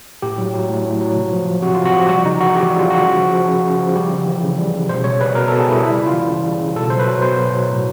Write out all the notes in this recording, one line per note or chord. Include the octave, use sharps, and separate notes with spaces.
A2 G4
F#3
F#3
A2
A2
F#3
C3
F3
F3
C3 F#4
F4
C3
F#4
F3 G4
G3 F#4
C#3 D#4
E3 F#4
C#3 G4
G3
F4
C#3 F#4
C#3
F3
F3
C#3
C#3
F3
G3 G4
C#3
E3
C#3
G3
C#3
B2 C5
G3 C#5
G3 B4
B2 A#4
A4
B2
G#4
G3 E4
G3 E4
C#3
F4
E3
C#3
G3
C#3
B2 A4
F#3 C5
B4
F#3
B2 C5
B2
F#3
A2